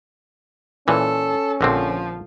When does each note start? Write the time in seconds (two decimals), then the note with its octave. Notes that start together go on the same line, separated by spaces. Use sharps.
0.88 A#2 E3 C#4 A4
1.61 A#1 D3 F3 C4